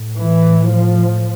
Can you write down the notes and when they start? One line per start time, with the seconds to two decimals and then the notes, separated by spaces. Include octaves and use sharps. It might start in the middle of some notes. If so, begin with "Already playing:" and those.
Already playing: A2
0.22 E3
0.73 F3